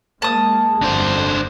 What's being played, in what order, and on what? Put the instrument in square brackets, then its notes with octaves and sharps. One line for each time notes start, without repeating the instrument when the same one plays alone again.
[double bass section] G#3 A#3 [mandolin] A5 D#6
[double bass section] G1 F2 [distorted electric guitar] D3 C5